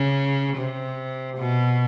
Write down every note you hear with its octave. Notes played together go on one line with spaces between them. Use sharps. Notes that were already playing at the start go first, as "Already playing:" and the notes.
Already playing: C#3
C3
B2